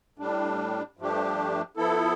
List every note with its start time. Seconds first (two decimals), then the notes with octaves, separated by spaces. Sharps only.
0.18 A2 G3 D4
0.97 G2 F3 A3 D4 G4
1.77 F3 B3 E4 A4